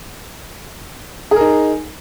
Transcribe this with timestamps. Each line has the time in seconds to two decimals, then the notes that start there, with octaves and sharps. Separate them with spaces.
1.31 G#4
1.36 A#4
1.41 D#4